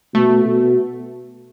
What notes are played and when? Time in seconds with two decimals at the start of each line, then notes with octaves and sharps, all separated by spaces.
0.15 B2 A3
0.45 B2